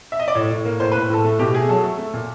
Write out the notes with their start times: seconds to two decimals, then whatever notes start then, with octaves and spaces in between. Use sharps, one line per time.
0.12 E5
0.19 D#5
0.28 D5
0.35 A2 C#5
0.50 A2
0.65 A#3
0.80 A2 C5
0.92 A2 B4
1.10 A2 A4
1.25 A3
1.39 B2 G4
1.54 A3 G#4
1.69 F#3 A4
1.84 A3
1.99 A3
2.13 A#2